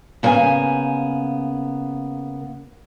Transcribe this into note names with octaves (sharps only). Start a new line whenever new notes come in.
C#3 A#3 B3 F5 G#5